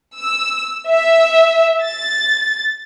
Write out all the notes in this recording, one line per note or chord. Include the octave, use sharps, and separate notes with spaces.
E6
E5
A6